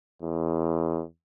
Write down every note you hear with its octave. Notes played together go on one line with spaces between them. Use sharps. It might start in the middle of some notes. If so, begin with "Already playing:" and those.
E2